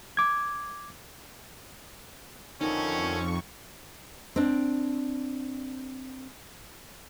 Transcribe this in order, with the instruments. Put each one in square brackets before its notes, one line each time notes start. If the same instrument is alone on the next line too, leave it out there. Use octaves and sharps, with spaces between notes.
[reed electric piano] D6 G#6
[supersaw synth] F2 C#6 [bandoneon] D3 D#3 F3 [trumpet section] C4 C#4 [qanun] D#4
[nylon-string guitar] C4 D4